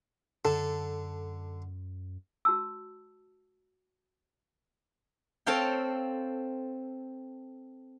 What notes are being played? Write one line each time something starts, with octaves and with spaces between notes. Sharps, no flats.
F#2 D3 A4
F#4 A5 E6
C4 A4 C5 C#5 F5 G5